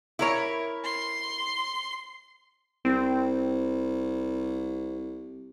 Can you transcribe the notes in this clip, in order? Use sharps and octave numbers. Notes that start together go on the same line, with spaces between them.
E4 A#4 C#5
C6
C2 C4